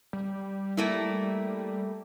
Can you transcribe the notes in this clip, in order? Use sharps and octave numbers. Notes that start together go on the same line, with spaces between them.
G3
A3 A#3 E4